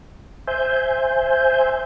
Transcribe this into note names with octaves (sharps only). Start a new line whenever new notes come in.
C5 E5 G#5 G6